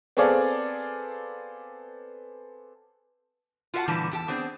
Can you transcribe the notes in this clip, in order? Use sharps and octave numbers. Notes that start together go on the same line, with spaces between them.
B3 C4 G#4 A4 D5 F5
F4 F#4 A#4 E5 F#5 A5
A#2 D3 E3 G3 A5
E2 G4 A5
B3 C4 D4 G#4